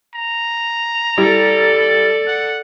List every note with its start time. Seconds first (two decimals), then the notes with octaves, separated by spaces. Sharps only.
0.15 A#5
1.18 G3 E4 A4 D5
2.27 F#5